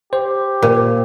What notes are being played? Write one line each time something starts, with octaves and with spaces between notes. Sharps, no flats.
G4 C5
A#2